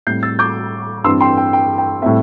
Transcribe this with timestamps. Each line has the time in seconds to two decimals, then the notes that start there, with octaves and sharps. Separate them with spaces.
0.07 A2 G3 C4 G6 C7
0.23 E6 A6
0.39 D6 G6
1.04 G2 E3 C4 C6 E6
1.21 G5 C6
1.37 G5
1.53 G5
1.78 G5
2.02 A2 G3 C4 E5